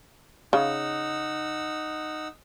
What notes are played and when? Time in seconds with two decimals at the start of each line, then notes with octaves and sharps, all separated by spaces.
0.53 C#3 D#4 F#5 E6